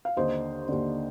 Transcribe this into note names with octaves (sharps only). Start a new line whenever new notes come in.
F5
D#2 D3 C5 D#5
D#2 D3